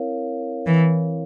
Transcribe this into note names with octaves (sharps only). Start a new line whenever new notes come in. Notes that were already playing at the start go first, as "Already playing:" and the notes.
Already playing: C4 E4 A#4 C#5 F5
E3